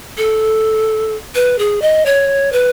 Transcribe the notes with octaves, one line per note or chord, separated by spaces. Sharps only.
A4
B4
G#4
D#5
C#5
B4